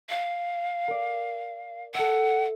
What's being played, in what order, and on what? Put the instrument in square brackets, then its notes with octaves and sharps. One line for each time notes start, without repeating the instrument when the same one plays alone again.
[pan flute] F5
[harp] A#4 D5
[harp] A4 E5 [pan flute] F#5